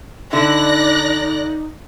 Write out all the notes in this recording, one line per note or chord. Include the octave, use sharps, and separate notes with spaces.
D3 D#4 E4 D5 F#6 A#6